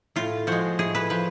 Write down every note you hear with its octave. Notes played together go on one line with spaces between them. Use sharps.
A2 F4
F3 G#3 F#4
A2 G#4
B4
F3 B4